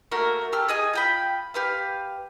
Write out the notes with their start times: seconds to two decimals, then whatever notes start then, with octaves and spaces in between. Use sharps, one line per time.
0.12 A3 A#3 F#4 A#4
0.52 G4 A4 F6
0.68 G#4 D#5 G#5
0.93 F4 G5 B5
1.54 G4 B4 F5